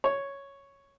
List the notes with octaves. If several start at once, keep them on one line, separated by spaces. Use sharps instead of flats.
C#5